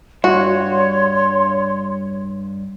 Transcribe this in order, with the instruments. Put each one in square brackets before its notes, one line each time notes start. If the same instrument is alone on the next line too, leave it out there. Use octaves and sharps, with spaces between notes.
[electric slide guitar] G2 [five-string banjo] F#4 [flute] C#5 [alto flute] C6